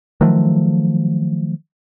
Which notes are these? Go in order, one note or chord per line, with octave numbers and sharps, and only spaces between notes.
D#3 F3 F#3 A3